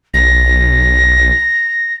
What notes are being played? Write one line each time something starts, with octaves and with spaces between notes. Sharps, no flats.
B1 A#6